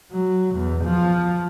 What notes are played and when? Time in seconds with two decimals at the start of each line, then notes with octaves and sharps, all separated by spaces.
0.11 F#3
0.55 E2
0.84 F3